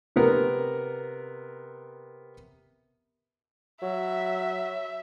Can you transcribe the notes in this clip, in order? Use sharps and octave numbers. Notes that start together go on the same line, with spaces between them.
C3 B3 A#4
F#3 E5